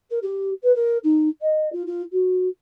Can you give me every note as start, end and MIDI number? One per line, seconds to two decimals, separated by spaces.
0.10 0.18 70
0.22 0.50 67
0.63 0.74 71
0.75 0.97 70
1.03 1.28 63
1.41 1.70 75
1.72 1.82 65
1.86 2.02 65
2.12 2.48 66